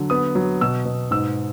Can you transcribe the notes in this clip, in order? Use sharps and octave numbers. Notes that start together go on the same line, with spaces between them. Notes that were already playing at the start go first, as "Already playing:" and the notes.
Already playing: D3 F#3
B3 D#6
F#3
B2 E6
B2
G#2 E6